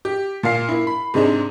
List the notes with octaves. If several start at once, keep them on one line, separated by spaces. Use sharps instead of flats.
G4
A#2 A#4 F5 C7
A#3 E4
B5
G#2 C3 G#3 D4 D#4